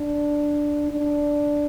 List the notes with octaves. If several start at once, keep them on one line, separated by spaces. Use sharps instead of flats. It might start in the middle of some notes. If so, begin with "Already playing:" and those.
Already playing: D4
D4